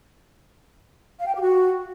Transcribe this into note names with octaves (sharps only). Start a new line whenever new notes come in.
F5
G5
G4
F#4